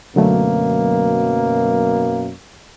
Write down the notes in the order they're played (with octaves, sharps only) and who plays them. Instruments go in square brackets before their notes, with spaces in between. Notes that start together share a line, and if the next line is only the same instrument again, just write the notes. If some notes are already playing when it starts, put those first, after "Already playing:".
[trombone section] F#2 B2 A#3 [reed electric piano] D3 F#3 A3